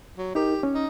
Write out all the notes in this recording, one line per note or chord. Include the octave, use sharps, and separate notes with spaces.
F#3
D#4 G4 A#4
C#4
D#4